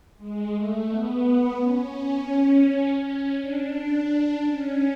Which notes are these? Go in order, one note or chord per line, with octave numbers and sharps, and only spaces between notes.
G#3
A3
B3
C#4
C#4
D4
D4
C#4